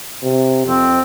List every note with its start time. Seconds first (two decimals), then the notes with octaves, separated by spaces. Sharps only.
0.23 C3
0.66 F2 C4